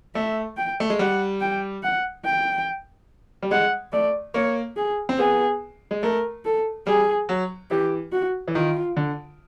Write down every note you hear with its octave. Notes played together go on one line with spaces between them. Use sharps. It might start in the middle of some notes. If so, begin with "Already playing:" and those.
A3 E5
G5
A3
G#3
G3 F#5
G5
F#5
G5
G3
G#3 F#5
A3 D5
A#3 C#5
G#4
C4
B3 G#4
G#3
A3 A#4
A4
G3 G#4
F#3
E3 G4
F#4
E3
D#3 F4
D3